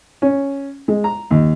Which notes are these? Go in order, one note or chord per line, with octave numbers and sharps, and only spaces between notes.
C#4
G#3
A#5
D#2